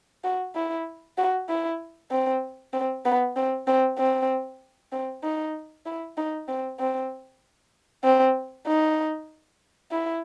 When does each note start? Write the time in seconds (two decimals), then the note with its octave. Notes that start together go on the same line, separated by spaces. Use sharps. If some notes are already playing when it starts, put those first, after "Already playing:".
0.24 F#4
0.55 E4
1.18 F#4
1.49 E4
2.11 C4
2.73 C4
3.05 B3
3.36 C4
3.67 C4
3.98 C4
4.92 C4
5.23 D#4
5.86 E4
6.17 D#4
6.48 C4
6.80 C4
8.04 C4
8.67 D#4
9.91 E4